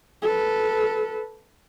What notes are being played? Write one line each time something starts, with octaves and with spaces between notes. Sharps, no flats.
A4 B4